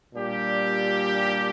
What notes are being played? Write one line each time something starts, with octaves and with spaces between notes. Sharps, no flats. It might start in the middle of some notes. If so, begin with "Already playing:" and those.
A#2 G3 D4 G4